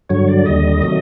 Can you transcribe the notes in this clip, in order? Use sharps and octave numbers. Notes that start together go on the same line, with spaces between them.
G2 D3 F#3 C#5
D5
D#2 D3 G3 D#5
C3 D#3 F#3 A3